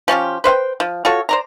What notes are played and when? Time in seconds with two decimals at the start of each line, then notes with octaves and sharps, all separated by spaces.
0.08 F3 C#4 F4 G4
0.44 B4 C5 F5 G5
0.80 F3
1.05 F4 F#4 A4 C#5
1.29 C5 D5 A#5